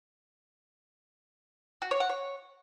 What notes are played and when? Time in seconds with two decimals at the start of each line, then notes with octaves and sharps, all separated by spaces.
1.82 F#4
1.91 C#5
2.00 F#5
2.09 C#5